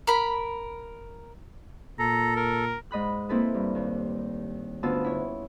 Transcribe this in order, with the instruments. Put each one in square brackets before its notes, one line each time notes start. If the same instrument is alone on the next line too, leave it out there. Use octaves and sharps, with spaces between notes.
[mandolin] A#4 B5
[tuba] A#2 [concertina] A4 [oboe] A#5
[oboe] A#4
[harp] G#2 D#5 B5 F#6
A#3 C4 E4 A4 B4
G2
D#2
D2 B3 C#4 F4 A5 E6
E4 C#5